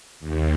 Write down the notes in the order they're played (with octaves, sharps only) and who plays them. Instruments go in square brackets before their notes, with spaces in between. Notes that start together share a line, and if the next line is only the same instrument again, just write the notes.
[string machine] D#2